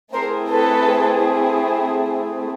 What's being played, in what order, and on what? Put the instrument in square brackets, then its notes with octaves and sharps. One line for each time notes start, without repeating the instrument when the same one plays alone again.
[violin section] A3 C4 E4 G#4 A#4 C5
A4 B4